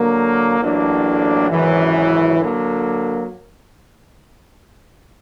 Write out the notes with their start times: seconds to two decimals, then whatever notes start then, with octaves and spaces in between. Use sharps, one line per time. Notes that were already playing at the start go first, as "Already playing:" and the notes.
Already playing: D3 F#3 A#3
0.61 A1 A2 F#3 A#3 D4
1.50 G#1 F#2 C#3 E3
2.39 D3 F#3 A#3